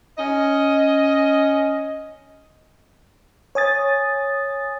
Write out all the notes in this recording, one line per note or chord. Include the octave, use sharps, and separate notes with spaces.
C#4 D#5
C#5 G#5 D#6 A6